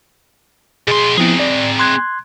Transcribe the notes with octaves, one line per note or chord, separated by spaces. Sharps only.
B2 G#4 C6
F3 B3 C4 E4 G#4
D5
C6 F#6 G#6